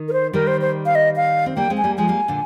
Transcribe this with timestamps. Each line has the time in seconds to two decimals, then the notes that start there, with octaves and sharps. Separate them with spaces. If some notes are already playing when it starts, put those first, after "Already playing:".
Already playing: D#3
0.08 A#4
0.13 C5
0.33 D#3 G3 A#4
0.47 C5
0.61 C5
0.86 F5
0.95 D#5
1.16 F5
1.46 C4
1.57 G3 A#3 G5
1.70 G#3 C4
1.78 G#5
1.84 G3 A#3
1.98 F3 G#3 G#5
2.08 G3 A#3
2.28 A#2 D3